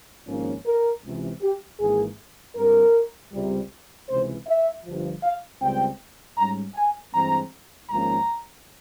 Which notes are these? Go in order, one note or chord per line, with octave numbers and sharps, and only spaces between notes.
G#1 G#2 F3 A#3 C#4
A#4
C#2 C3 E3
G4
G#1 G#2 E3 A#3 G#4
G2 G3 C4 A#4
C#2 C3 G3
C#2 C3 E3 C5
E5
G1 G2 F3
F5
C#2 C#3 G3 C4 G5
G#2 G3 C#4 A#5
G#5
G2 E3 G#3 C4 A#5
G#1 G#2 F3 A#3 C#4 A#5